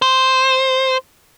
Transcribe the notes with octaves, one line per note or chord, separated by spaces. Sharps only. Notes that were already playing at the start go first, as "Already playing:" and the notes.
C5